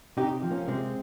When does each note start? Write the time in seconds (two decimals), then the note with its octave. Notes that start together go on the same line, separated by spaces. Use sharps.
0.17 C3 D#4 G4
0.43 F3
0.51 A#3 C#4
0.68 C3 G#3 C4